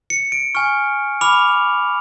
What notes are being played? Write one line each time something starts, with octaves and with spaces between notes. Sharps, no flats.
C#7
D7
G#5 C#6 F6
B5 D6 F6 F7